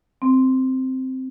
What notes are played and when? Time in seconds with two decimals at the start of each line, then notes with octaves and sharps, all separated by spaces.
0.22 C4